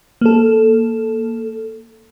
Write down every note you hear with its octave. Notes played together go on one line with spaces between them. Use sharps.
A#3 A4